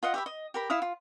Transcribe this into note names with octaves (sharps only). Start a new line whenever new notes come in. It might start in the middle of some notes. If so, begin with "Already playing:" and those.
F4 D#5 F#5
G4 E5 B5
D#5
G4 A#4 B5
E4 E5 F5 D#6
F4